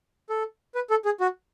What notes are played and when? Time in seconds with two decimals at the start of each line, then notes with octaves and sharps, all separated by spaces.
0.30 A4
0.75 B4
0.90 A4
1.05 G#4
1.20 F#4